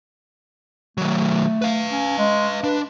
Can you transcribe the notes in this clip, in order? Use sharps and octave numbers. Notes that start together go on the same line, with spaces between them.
D#3 F#3 A3
B4 F5
C#4
G#3
D4 B4